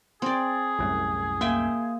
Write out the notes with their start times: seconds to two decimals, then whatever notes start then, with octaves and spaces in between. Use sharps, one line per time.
0.22 C4 G#4 D5
0.79 C2 F#2 A2
1.41 A#3 E5 G5 G#5